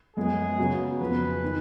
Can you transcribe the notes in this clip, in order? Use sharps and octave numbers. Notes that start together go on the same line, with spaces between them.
F#2 F3 G#3 B3 G#4
C#3 F#3 B3 F#4
F2 F3 B3 B4
D#3